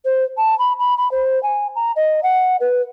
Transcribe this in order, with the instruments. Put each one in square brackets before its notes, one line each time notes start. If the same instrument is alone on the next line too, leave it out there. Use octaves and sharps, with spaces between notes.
[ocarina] C5
A5
B5
B5
B5
C5
G#5
A#5
D#5
F#5
B4